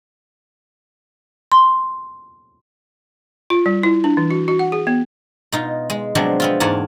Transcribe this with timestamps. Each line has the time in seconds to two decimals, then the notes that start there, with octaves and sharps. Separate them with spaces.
1.52 C6
3.50 F4
3.66 G3
3.83 E4
4.04 D4
4.17 E3
4.31 F#4
4.48 F#4
4.59 F#5
4.72 G#4
4.87 B3
5.52 B2 D#4 F4
5.90 G#3
6.15 B2 F3 F#3 G#3 C4 D4
6.40 B3 C4 F4
6.60 E2 G#2 A#3 F#5 G#5 A5